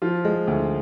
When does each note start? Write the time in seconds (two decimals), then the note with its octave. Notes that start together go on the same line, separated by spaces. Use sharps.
0.02 F3 F4
0.25 G#3
0.47 D2